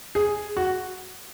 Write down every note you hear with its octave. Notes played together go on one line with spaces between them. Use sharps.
G#4
F#4